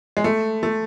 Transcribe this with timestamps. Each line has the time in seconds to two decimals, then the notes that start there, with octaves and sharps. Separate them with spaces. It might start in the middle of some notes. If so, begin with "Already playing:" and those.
0.17 G#3
0.24 A3
0.63 A3